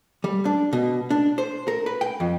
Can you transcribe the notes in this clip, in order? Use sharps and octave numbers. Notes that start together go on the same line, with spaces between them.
G3
D4
B2
D4
C5
A#4
B4
G5
F2